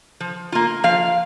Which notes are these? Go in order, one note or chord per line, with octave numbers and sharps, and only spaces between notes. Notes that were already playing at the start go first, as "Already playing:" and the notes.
F3
A#3 F4
F3 F5